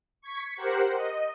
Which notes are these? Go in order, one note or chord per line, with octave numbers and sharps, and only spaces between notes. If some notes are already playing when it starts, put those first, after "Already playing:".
C#6 G#6 B6
G4 A#4 C5 F#5
D#5